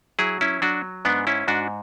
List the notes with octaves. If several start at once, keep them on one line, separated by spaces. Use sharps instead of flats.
F#3 E4 G#4
C#4 E4
F#3 D4 F#4
G#2 B3 D4
C#4 E4
G#2 D4 F#4